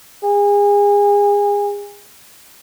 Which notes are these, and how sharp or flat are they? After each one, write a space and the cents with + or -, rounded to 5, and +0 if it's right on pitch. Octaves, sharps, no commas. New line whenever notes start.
G#4 -30